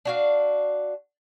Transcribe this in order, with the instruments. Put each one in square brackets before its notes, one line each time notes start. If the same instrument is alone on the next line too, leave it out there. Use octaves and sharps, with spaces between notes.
[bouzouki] D4 F#4 F5